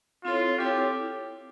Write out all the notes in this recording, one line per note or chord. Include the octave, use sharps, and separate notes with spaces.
C4 E4 F4 A4 C#5
C4 E4 G4 A4 C#5